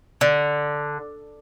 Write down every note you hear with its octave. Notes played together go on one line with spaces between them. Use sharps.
D3